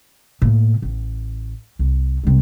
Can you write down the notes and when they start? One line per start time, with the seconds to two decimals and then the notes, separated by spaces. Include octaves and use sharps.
0.42 A2 A#3
0.82 A1
1.79 C2
2.24 C2 G#3